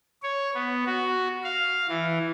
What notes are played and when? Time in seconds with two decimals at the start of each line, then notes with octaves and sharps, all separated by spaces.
0.23 C#5
0.54 B3
0.86 F#4
1.44 F5
1.88 E3